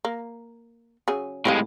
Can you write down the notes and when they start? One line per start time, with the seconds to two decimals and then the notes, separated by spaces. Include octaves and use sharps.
0.05 A#3
1.08 C#3 F#3 G#4
1.45 A2 G#3 C4 G4 F5